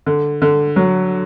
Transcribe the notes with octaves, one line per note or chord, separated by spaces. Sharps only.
D3
D3
F#3